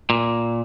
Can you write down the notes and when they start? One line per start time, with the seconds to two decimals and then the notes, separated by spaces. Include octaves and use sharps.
0.10 A#2